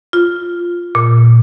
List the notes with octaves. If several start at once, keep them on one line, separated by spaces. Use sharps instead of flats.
F4
A#2